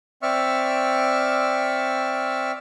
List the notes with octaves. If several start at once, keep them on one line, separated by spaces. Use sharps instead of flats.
C4 D5 E5 C#6 E6 F6